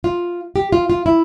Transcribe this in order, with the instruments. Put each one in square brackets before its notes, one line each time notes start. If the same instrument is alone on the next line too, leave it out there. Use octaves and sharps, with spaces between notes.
[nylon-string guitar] F4
G4
F4
F4
E4